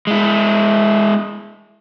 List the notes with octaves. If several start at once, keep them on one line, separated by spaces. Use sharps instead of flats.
G#3 E4